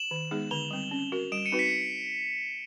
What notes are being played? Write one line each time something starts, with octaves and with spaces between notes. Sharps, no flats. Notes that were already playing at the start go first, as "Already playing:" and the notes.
Already playing: E7 F#7
D#3
G#3 B3 D#4 G#4
D3 F7 G7
G3 C4
C#4
F#4 A#4
G3 D7 E7
C#7 D#7
C4 D#4 F#4 B4
B6 C#7